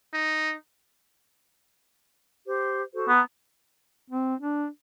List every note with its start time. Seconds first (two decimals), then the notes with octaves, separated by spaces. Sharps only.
0.13 D#4
2.46 G4 C5
2.93 F#4 A4 C5
3.09 B3 A#5
4.10 C4
4.40 D4